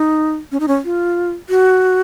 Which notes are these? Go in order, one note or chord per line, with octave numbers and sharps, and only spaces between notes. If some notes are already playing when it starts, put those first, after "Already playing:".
Already playing: D#4
C#4
D#4
C#4
F4
F#4